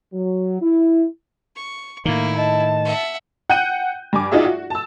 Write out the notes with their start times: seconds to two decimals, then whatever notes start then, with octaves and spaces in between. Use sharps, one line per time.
0.14 F#3
0.61 E4
1.56 C#6
2.05 A2 D#3 A#3 E4
2.37 D#5 A5
2.85 E5 F#5
3.49 F#5 G5 F#6 G6 D#7
4.13 G2 G#5 D6
4.32 D#4 F4 F#4 G#4 D5 E5
4.45 F#4
4.70 A5 E6